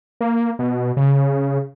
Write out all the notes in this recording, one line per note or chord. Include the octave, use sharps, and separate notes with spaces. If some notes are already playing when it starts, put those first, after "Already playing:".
A#3
B2
C#3